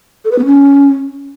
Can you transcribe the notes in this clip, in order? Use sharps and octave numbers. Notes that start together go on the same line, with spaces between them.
A4
B4
B3
C#4